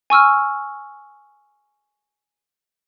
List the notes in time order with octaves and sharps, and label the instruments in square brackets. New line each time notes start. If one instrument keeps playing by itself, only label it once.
[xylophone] G#5 C#6 E6 F6